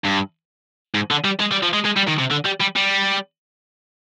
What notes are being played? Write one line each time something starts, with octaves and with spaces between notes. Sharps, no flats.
G2
G#2
D3
G3
G#3
G3
F3
G#3
G#3
G3
D#3
C3
D3
G3
G3
G3